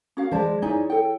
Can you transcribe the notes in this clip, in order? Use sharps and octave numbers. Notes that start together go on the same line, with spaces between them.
C#4 F#4 F5
E3 G#3 C5 D5 A5
D#4 E4 C#5 D5 G#5
A4 G5